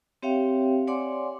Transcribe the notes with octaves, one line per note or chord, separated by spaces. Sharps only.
C4 G4 C#5 E5 F5 G5
C#5 D5 F#5 G#5 C6 D6